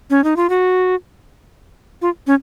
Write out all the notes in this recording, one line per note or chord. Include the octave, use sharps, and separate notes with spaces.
C#4
D#4
F4
F#4
F4
C#4